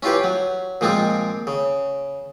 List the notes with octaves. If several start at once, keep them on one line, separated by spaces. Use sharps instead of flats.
C#4 E4 F4 G4 B4
F#3
A#2 F3 G#3 C4 F4
C#3